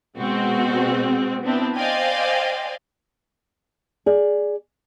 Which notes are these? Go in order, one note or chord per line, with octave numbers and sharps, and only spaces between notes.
B2 G#3 C4 F#4
B3 C4 D4 E4
C5 D5 D#5 F5 G5 G#5
G#4 D5